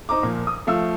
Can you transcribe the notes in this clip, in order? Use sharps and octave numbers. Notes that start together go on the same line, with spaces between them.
D#4 C5 A#5 D6
A#2 F3 A#3
D#6
F3 A3 F5 E6